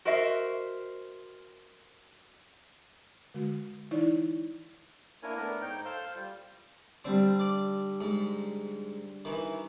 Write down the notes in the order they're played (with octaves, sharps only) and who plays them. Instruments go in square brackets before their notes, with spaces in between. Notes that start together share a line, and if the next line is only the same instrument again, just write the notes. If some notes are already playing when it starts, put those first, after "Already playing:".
[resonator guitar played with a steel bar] F#4 A#4 C5 D#5 E5
[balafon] D3 G#3 F#4
E3 D#4 E4 C#5 D5
[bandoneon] A#3 D4 E4 A#4 C#5 G#5
A3 B3 D4 A#4
G#2 D#4 C#5 G5
A4 C5 F5 C6 E6 G6
G3 F4
[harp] D3 G3 [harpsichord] C4
[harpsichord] D5
G#2
D#3 E3